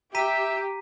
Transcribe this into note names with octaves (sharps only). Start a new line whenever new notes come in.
G4 E5 A#5 B6 D#7